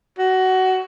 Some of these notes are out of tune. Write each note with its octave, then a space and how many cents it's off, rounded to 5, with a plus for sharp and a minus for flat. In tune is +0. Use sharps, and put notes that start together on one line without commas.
F#4 +20